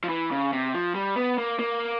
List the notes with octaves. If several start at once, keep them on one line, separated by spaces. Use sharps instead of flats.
F3
E3
C#3
C3
F3
G3
B3
A#3
A#3